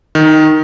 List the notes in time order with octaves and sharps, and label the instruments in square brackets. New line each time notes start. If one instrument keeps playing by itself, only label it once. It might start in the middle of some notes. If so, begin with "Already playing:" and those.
[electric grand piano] D#3